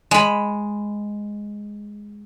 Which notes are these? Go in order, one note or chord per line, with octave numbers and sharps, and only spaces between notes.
G#3 B5